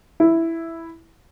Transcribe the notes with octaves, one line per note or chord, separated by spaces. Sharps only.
E4